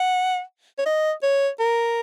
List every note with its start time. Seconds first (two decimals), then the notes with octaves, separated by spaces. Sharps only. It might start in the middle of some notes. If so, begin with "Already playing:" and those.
Already playing: F#5
0.78 C#5
0.86 D#5
1.23 C#5
1.60 A#4